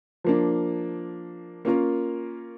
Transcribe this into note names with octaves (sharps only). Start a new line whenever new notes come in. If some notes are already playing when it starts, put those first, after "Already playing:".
F3 A#3 D4
A#3 C#4 F4 A#4